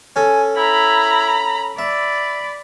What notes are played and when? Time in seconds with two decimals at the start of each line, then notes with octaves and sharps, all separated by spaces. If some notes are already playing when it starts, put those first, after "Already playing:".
0.16 C#4 A4 G#5
0.57 E4 A#5 B5
1.79 D5 E5 B5